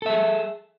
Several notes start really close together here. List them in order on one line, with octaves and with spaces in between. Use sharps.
A4 E5 G#4